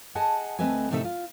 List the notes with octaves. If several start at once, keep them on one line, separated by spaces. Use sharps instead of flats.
G#4 D#5 F#5 G#5 A5
D2 A3 C4 B4 D#5 G#5
A2 C3 A3 D#4 A4 E5
F4